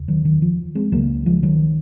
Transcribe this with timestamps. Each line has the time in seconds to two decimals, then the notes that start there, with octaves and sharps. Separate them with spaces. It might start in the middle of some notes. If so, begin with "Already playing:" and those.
Already playing: F1 D#2 C#3
0.08 D#3 F#3
0.25 D#3
0.42 F3
0.75 G#3 C4
0.92 C#2 C#3 F#3 A#3
1.26 F3 G#3
1.43 D#3 F#3